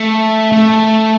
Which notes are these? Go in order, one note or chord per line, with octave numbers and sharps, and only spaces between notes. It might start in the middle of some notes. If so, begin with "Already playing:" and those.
Already playing: A3
A3